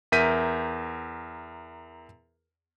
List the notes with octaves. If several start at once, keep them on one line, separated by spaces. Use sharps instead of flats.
E2 A#4 E5 G6 B6 D#7